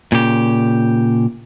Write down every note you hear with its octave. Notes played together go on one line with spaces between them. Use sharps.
A#2 C#3 G4